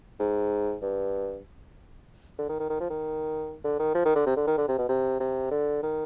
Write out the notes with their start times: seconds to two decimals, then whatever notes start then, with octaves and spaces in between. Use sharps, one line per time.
0.20 G#2
0.82 G2
2.38 D3
2.49 D#3
2.59 D#3
2.70 D#3
2.80 F3
2.90 D#3
3.64 D3
3.80 D#3
3.95 F3
4.05 D#3
4.15 D3
4.26 C3
4.36 D3
4.47 D#3
4.58 D3
4.68 C3
4.78 B2
4.89 C3
5.20 C3
5.51 D3
5.83 D#3